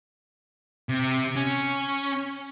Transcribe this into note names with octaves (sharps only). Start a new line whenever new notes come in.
C3
C#4